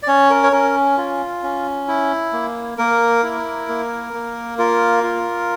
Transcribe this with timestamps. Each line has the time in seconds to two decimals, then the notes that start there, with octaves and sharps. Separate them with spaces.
0.03 D5
0.08 C#4 C#5
0.30 A#4
0.43 C#5
0.52 C#4 A#4
0.98 F4
1.43 C#4
1.88 E4
2.33 A#3
2.78 A#3 A#4
3.23 E4
3.69 A#3
4.14 A#3
4.59 F4 A#4
5.04 F4